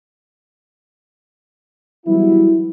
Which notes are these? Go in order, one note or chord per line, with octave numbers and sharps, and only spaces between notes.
E3 F#3 G3 B3 E4